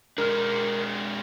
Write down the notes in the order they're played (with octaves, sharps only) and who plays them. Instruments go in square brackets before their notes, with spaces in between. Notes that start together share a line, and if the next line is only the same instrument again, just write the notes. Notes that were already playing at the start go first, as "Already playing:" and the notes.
[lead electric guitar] G#3 D4 [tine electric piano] A#4 F6